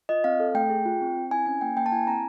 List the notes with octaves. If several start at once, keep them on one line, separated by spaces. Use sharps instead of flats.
F4 D#5
C4 F5
A4
A3 G5
G#4
F4
C4
C4
E4 G#5
C#4 G#5
A#3 G5
A#3 G5
A5
E4 G#5
C4 A#5